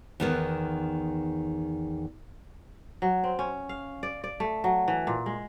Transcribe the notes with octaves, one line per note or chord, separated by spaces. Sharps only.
E2 D#3 B3
F#3
C4
C#4
F5
D5
D5
A3
F#3
E3
A#2
G#3